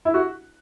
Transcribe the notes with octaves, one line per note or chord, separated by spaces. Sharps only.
E4
F#4